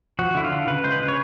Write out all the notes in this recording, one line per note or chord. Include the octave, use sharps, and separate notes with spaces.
F3 F#4
D3 E4
F4
D3
C#3 B4
G#3 C5
B4
C#3
C#5